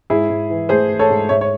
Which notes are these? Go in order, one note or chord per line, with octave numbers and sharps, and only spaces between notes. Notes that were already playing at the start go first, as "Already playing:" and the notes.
G#2 E4 G#4
G#2
E3
A3 G#4 C5
E3
A4 C#5
G#2
G#2 C#5 E5
C#5